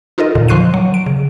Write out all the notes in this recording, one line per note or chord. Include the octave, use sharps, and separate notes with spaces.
D#4 F4 A4 A#4 D#5
E2 A#2 D3
F3 C6 C#6 F#6 C7 D#7
F#3
D7
C#3